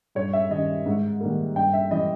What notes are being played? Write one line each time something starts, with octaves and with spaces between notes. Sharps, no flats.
G2 C#5
E5
D#3 G3 C#4 D#5
G#2
D#3 G3 A#3
G2 G5
E5
E3 G3 D#5